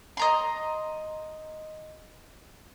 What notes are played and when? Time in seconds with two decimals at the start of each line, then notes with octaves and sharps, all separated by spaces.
0.17 D#5 A#5 C6